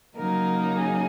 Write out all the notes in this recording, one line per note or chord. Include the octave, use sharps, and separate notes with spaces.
C#3 F#3 A#3 D#4 A#4
G#4